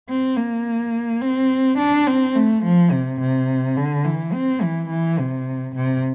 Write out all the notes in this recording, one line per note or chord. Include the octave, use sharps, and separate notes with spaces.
C4
A#3
C4
D4
C4
A3
F3
C3
C3
D3
E3
C4
E3
E3
C3
C3